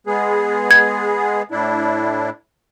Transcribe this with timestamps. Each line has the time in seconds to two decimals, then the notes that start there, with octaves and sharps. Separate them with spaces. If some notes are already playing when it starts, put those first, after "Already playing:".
0.07 G#3 B3 G#4
0.71 G#6
1.51 A2 D4 E4